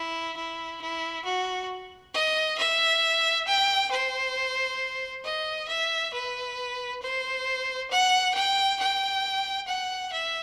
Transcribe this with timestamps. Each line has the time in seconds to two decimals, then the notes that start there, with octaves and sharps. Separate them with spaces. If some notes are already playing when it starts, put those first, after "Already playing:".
Already playing: E4
0.37 E4
0.81 E4
1.25 F#4
2.14 D#5
2.58 E5
3.47 G5
3.91 C5
5.24 D#5
5.69 E5
6.13 B4
7.02 C5
7.91 F#5
8.35 G5
8.80 G5
9.68 F#5
10.12 E5